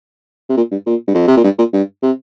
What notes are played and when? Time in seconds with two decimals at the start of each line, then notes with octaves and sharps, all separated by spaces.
0.49 C3
0.57 A#2
0.71 G2
0.86 A#2
1.08 G2
1.15 F2
1.28 C3
1.37 A#2
1.44 G2
1.59 A#2
1.73 G2
2.03 C3